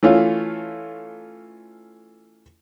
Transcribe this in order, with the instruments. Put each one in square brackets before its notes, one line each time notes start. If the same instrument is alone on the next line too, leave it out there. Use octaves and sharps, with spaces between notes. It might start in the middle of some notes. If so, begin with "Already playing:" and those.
[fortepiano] E3 A3 C#4 F4